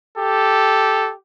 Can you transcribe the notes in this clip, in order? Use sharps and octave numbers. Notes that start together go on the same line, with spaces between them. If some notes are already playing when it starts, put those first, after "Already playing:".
G4 A4